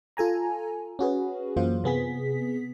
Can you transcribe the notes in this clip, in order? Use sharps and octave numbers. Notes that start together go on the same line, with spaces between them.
F4 A4 G#5 A#5
C#4 F#4 G#4 B4
F#2 E3 A#3 F4 C5
C3 B3 G#4 B6